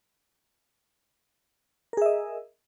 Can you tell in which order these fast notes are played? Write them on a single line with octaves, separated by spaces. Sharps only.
A#4 G#4 E5 D#5